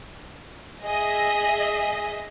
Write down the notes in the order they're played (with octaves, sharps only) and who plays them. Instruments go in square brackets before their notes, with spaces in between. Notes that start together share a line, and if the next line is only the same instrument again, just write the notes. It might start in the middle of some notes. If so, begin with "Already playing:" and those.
[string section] G#4 D#5 E5